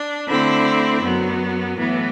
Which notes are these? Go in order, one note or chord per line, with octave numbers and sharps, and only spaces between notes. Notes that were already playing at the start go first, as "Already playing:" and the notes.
Already playing: D4
D3 A3 C4 E4
F#2 F#3 B3
A2 E3 B3